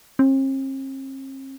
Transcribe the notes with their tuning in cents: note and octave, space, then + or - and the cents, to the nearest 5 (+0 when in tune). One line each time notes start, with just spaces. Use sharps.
C4 +45